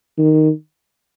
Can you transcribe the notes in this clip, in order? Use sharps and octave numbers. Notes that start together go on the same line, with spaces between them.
D#3